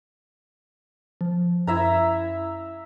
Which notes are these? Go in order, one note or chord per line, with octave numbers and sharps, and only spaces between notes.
F3
F#2 E4 E5 A#5